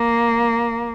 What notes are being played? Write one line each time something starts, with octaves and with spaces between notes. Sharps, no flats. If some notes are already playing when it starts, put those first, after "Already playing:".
Already playing: A#3